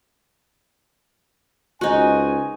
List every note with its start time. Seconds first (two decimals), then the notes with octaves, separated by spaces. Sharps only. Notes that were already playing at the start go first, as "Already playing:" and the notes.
1.81 C#2 D#4 F#4 C5 G#5